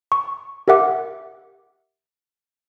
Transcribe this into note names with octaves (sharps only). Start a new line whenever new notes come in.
C#6
G4 A#4 E5 F#5 D6